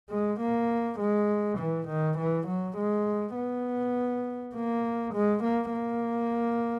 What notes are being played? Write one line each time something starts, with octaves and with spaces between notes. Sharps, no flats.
G#3
A#3
G#3
E3
D#3
E3
F#3
G#3
B3
A#3
G#3
A#3
A#3